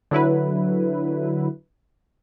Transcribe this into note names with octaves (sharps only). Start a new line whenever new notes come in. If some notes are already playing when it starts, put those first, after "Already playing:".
D3 F#3 E4 B4